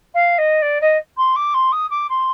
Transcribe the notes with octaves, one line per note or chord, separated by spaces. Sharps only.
F5
D#5
D5
D#5
C6
D6
C6
D#6
D6
C6